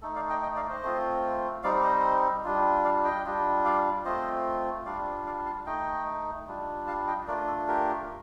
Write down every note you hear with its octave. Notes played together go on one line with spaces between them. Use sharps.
A3 D#4 A4
D5 F5
D#5 G5
D#5 G5
D5 F5
C5 D#5
A3 C4 F4
G3 C4 D#4 D5 F5
C5 D#5
G3 D4 F4
D5 F5
D#5 G5
G3 D4 F4
D5 F5
A3 C4 F4 C5 D#5
G3 D4 F4 D5 F5
D5 F5
F5 A5
A3 D#4 D#5 G5
G3 D4 F4
F5 A5
D#5 G5
A3 D4 F4 A#4 D5
A4
G4 A#4